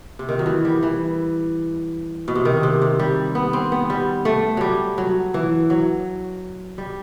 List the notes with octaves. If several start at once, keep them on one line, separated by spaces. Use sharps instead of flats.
C3
D#3
F#3
E3
G3
E3
B2
C3
D#3
C3
C3
G3
B3
C4
B3
G3
A3
F#3 G3
F#3
E3
F#3
G3